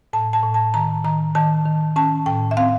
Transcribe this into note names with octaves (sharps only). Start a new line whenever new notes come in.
A2 A5
A5
A2
A5
D#3 A#5
D#3 A#5
D#3 A5
D#3
C#4 A5
A2 G5
E5
C4 F5